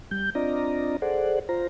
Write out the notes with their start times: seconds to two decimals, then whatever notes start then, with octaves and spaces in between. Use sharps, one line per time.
0.11 G3 G6
0.35 C4 D4 F4 D5 D#5 A#5
1.02 G#4 A4 C5 D5 F#5
1.49 F4 C5 A#5